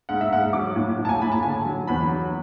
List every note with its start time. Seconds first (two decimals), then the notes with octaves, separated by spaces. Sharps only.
0.09 G#2 F#5
0.21 E5
0.31 G#2 F#5
0.53 F#3 D6
0.76 A2
0.98 A2
1.05 A5
1.09 G#5
1.21 A2 B5
1.32 A5
1.43 D3 G#5
1.65 F#3
1.88 E2 B5
2.11 F#3